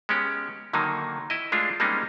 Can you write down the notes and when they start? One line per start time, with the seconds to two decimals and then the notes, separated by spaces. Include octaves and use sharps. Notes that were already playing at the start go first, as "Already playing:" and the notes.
0.09 G#3 B3 C#4 G4
0.73 D3 D#3 F#3 A#3 D#4
1.30 E4 D#5
1.52 G#3 A3 D4 F4
1.80 G3 G#3 A#3 C4 C#4 D#4